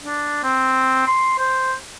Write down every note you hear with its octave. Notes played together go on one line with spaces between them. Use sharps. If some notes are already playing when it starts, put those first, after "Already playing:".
D4
C4
C6
C5